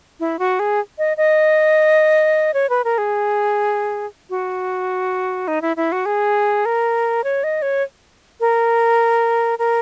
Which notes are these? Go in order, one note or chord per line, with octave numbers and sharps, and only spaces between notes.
E4
F#4
G#4
D#5
D#5
C#5
B4
A#4
G#4
F#4
D#4
E4
E4
F#4
G#4
A#4
C#5
D#5
C#5
A#4
A#4